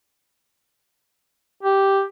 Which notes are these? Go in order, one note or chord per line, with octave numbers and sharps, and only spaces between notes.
G4